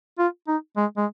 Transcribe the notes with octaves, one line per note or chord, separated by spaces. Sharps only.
F4
D#4
G#3
G#3